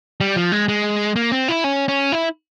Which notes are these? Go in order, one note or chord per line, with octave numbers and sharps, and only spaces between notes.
G3
F3
G#3
G#3
A#3
C4
E4
C#4
C#4
E4